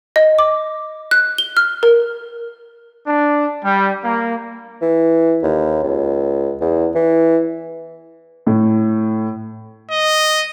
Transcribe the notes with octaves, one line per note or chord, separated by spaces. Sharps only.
D#5
D6
F#6
G7
F6
A#4
D4
G3
A#3
E3
D#2
C#2
E2
E3
A2
D#5